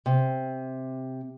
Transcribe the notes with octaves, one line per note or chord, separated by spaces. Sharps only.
C3